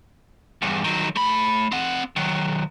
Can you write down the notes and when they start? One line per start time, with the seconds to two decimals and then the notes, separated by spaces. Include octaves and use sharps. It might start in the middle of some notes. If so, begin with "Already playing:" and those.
0.62 E2 G2
0.84 D#3 F#3
1.16 A3 B5
1.72 C4 F#5
2.16 D#3 F#3